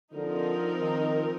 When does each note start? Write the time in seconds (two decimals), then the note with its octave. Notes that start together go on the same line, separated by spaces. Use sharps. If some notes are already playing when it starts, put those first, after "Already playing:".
0.14 D3 F3 C4 D#4 A#4
0.81 D#3